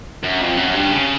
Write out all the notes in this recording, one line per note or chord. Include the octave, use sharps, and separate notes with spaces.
F#2
F2
F#2
G2
C#3